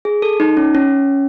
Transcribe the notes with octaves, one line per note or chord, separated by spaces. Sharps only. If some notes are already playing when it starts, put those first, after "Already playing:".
G#4
A4
D#4
C#4
C#4